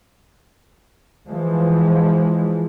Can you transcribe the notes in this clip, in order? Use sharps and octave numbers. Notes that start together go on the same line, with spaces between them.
E3 F3 G#3